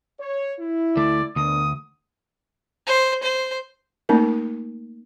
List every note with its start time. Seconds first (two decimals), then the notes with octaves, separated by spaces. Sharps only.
0.20 C#5
0.59 E4
0.97 D2 A3 D5
1.36 D2 B2 D4 A#4 D#6
2.87 C5
3.23 C5
4.09 A3 A#3 C#4 D#4 A#4